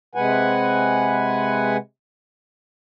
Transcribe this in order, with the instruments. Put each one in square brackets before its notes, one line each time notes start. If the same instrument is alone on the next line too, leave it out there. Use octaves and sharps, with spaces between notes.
[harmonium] C3 G#3 B4 F#5 G#5